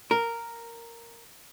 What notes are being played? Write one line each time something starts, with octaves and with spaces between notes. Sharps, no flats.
A#4